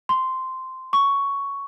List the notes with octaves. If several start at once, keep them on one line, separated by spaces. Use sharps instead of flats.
C6
C#6